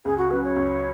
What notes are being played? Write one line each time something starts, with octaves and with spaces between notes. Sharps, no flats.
C#2 G#4
F#4
C#3 F#3 B4
C#5
C#2